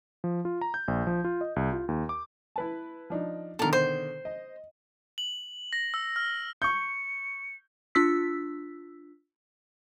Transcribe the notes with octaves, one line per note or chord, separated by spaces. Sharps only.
F3
F4
A#5
G6
A#1
F3
F4
D#5
C2
F4
D#2
D6
E4 B4 A5
F3 D4 D#4
B2 D3 D#3 A4 A#4
C5
D#5
F#7
A#6
E6
F6
C#6 G6 C#7
D4 F4 E6 B6